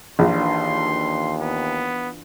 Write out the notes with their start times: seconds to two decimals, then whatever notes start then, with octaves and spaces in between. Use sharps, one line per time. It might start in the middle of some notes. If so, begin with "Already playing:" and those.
0.19 A#1 D#2 E3 D4 F4 C6
1.40 B3